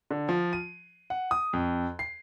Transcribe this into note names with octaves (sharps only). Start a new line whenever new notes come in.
D3
F3
D#7
F#5
D#6
F2
C7